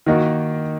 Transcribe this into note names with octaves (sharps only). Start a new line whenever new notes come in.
D#3 A#3 D#4 F#4